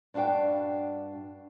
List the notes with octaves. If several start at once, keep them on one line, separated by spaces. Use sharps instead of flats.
G2 D4 F#4 F5 G5